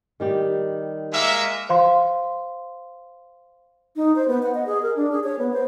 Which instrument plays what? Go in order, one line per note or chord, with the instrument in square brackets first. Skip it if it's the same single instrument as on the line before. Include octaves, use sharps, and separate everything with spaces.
[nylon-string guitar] D#3 G3 G4
[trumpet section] G#3 A#3 E5
[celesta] C5 F5 C6
[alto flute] D#4
C5
B3
F#5
D#5
G#4
A#4
D4
G#4
C#5
B3
C5